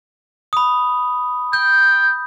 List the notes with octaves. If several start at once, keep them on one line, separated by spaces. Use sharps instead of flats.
B5 D#6
G5 G6